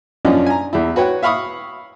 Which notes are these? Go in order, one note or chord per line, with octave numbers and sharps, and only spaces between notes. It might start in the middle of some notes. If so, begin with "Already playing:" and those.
F#2 F3 C#4 D4 D#5
G#5 A#5
E2 E4
F#4 B4 C#5 G5
E5 F5 B5 C#6 D#6